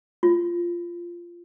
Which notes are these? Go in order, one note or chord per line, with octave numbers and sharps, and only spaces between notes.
F4